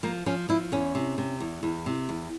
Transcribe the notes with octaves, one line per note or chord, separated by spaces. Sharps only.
F3 A#3
F3 C#4
F3 E4
E2 C#4
C3
C3
E2
E2
C3
E2